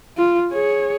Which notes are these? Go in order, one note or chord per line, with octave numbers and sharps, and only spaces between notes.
F4
G#4 C#5